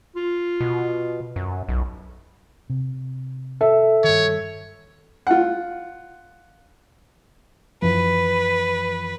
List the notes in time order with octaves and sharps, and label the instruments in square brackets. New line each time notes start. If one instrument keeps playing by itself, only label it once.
[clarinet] F4
[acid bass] B2
F#2
B1
[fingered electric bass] C3
[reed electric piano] A4 [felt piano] E5
[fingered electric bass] G2 D#3 [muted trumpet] C#5
[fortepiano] F4 F#5
[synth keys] F#2 E3 F3 [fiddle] B4